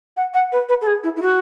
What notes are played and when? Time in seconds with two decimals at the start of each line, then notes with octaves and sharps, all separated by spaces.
0.16 F#5
0.33 F#5
0.52 B4
0.68 B4
0.81 A4
0.86 G#4
1.03 E4
1.16 E4
1.21 F#4